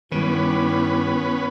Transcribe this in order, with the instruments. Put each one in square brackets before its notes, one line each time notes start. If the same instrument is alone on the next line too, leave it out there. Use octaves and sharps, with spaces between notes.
[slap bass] G2 D#3 [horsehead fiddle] G3 E4 [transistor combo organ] B3 C#4 B4